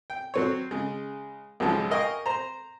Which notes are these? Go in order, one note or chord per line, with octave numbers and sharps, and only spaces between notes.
G5
F#3 C4 C#5
C#3 G#3
B1 G#2 C#3 F3 G#3 C#4
A#4 D#5 F5 G5 G#5 C#6
C5 A#5